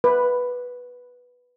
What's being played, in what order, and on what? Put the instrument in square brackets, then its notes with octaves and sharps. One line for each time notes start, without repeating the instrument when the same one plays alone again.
[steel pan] B4